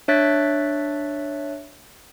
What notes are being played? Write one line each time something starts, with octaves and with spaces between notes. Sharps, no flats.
D4 C#5 E5 F#6 A6 B6